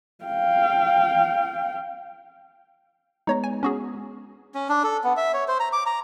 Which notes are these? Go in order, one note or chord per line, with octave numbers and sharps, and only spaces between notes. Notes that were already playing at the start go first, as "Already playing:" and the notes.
F5 G5
G#3 B3 D#4 C#5 A#5
G#5
C#4 F#4 G#4
C#4
D4
A4
B3
E5
C#5
C5
A#5
D6
A#5